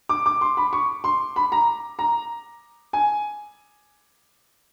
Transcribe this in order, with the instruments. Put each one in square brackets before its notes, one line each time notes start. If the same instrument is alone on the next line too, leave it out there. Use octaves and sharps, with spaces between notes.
[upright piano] D6
D6
C6
B5
C#6
C6
B5
A#5
A#5
G#5